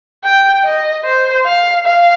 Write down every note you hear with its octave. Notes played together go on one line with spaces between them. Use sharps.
G5
D#5
C5
F5
F5